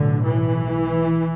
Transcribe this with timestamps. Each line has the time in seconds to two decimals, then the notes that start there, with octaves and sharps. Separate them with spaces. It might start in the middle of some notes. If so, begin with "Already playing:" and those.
Already playing: B1 A2 D3
0.23 E3